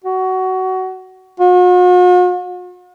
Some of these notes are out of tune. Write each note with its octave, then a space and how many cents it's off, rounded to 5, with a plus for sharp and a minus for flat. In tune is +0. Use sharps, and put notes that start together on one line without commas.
F#4 +20
F#4 -45